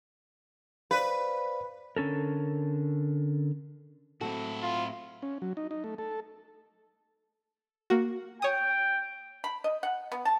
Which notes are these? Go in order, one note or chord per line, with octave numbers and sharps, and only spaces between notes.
B4 C5 D5 F5
D3 C#4 A4 A#4
A2 F#3 C4 E4 F#4 A4
F4
C#4
F#3
D#4
D#4
A3
A4
A#3 F#4
C#5 G5 D#6
B5
D#5
F#5
B3
A5